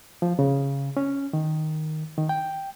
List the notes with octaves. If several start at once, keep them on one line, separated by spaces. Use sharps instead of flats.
F3
C#3
C#4
D#3
D#3
G5